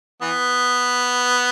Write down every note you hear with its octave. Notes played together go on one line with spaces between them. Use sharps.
E3 B3